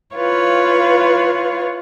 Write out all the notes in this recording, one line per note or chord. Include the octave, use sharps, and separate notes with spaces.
E4 F4 B4 C#5 F5